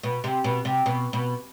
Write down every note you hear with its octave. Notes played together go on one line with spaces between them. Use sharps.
B2
C3
B2
C3
B2
B2